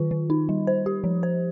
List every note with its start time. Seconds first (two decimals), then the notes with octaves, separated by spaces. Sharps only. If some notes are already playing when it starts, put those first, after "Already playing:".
Already playing: D#3 F4
0.11 D#3
0.30 D#4
0.49 G3
0.67 C5
0.86 G4
1.04 F3
1.23 C5